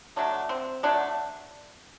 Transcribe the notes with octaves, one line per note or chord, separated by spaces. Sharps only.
D3 F#3 A3 D4
C4
D3 F#3 A3 D4